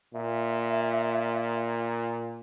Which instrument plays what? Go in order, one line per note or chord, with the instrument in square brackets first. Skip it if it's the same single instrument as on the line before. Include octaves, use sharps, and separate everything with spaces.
[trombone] A#2 [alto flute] E5